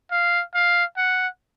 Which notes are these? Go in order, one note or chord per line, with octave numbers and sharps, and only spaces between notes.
F5
F5
F#5